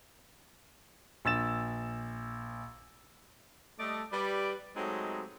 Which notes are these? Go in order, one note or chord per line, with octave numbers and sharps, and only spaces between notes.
A#1 E6 A6 E7
G3 A3 A4 D5 D#5
G3 B4 D5
F#3 G#3 A3 C4 D#4 G4